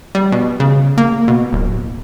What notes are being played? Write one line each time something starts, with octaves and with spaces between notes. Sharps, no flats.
G3
B2
C#3
A#3
B2
D1